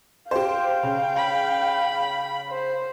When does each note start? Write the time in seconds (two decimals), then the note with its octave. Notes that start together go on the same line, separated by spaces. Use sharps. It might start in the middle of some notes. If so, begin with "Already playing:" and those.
0.31 G4 C5 F5 G5
0.83 C#3
1.17 B5
2.50 C5